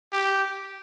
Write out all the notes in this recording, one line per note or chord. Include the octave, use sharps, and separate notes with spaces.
G4